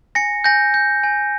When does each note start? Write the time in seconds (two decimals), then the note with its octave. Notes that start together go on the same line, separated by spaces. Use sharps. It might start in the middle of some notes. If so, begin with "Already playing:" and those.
0.15 G#5 A#6 C#7
0.44 G#5 G6 A#6
0.74 G6
1.03 G#5